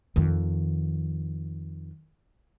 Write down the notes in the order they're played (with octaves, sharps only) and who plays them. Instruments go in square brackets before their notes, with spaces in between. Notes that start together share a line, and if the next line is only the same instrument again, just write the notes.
[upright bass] F2 D#3